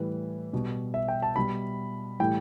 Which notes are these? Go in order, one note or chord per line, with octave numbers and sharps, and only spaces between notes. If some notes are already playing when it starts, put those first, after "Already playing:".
Already playing: A2 E3 G3 B4
B2 G3
E5
G5
A5
B2 G3 B5
A2 E3 G3 G5